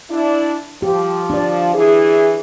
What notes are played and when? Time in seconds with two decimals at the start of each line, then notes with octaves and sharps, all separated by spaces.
0.10 D4 E4
0.82 F3 G4
1.30 D4 D5
1.74 E3 G#4